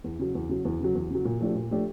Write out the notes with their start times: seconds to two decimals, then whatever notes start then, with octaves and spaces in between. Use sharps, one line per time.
0.04 E2
0.19 C#3 F#3
0.35 E2
0.49 C#3 F#3
0.65 E2
0.81 C#3 F#3
0.95 E2
1.11 C#3 F#3
1.25 A#2
1.41 F3 A3 D4 G4
1.55 A#2
1.71 F3 A3 D4 G4